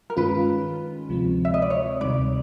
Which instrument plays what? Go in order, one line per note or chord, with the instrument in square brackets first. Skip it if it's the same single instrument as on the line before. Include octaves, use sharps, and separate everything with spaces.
[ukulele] A#4
[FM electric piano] G2 D#3 G#3 C#4 F4 [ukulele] B4
[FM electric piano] D2 C3 F3 G#3 C4
[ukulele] E5
D#5
D5
C#5
[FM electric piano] D2 C3 D#3 G3 [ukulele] D5